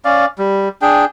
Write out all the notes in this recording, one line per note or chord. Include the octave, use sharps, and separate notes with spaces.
C#4 D5 F5
G3
D4 G#4 G5